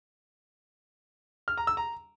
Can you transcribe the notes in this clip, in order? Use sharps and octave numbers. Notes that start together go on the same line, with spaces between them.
F6
A#5
E6
A#5